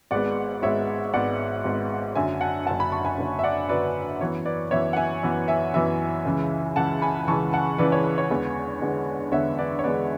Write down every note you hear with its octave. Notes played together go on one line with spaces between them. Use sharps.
G#1 G#2 G#3 B3 D5 F#5
G#1 G#2 G#3 B3 C#5 E5
G#1 G#2 G#3 B3 D5 F#5
G#1 G#2 G#3 B3
F#1 F#2 D3 E5 G#5
F#5 A5
F#1 F#2 D3 F#5 A5
G#5 B5
A5 C#6
G#5 B5
F#1 F#2 D3
E5
D5 F#5
F#1 F#2 D3 B4 D5
F#2 E3 B3 C#5
B4 D5
F#2 E3 B3 C#5 E5
F#5
E5 G#5
F#2 E3 B3
E5 G#5
F#2 E3 B3 E5 G#5
C#2 C#3 E3
C#2 C#3 E3 F#5 A5
G#5 B5
C#2 C#3 E3 A5 C#6
F#5 A5
C#2 C#3 E3 B4 D5
C#5
B4
C#5
E2 D3 G#3 B3
E2 D3 G#3 B3
E2 D3 G#3 B3 C#5 E5
B4 D5
C#5
E2 D3 G#3 B3 B4 D5